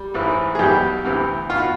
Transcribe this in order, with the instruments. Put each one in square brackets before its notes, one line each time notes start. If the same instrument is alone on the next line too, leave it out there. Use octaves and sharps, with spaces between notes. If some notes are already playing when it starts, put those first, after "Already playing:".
Already playing: [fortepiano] G3
A1 G#2 E3
G#4
B1 B2 G3 G4
D2 C3 E3
B2 F4
F#4